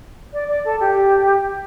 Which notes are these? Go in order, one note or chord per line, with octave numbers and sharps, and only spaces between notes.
D5
D5
A4
G4